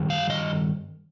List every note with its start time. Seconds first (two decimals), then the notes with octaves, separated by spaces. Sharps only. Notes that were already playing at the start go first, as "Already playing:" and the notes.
Already playing: G2 D#3
0.10 F5
0.30 D#5